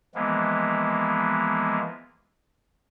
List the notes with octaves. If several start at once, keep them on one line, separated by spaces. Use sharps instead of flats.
E3 F3 G#3 A#3 B3